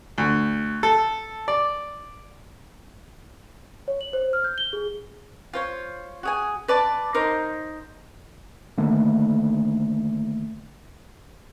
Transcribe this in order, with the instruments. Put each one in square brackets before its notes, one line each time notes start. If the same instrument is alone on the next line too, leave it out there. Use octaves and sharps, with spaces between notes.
[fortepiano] D2
A4
D5
[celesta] C#5
F#7
C5
F6
G6
G7
G#4
[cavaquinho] F4 C5 C#5
F#4 G#4 G#5
B4 D5 A5 D6
D#4 A#4 C5 C6
[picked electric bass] D3 D#3 A3 A#3